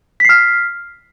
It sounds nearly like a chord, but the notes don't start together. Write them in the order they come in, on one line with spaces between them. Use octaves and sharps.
B6 C7 F6